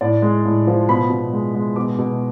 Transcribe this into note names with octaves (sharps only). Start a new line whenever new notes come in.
A2 D5
G#3
A2
F3
B2 B5
B2
G#3
G#3
B2 D6
B2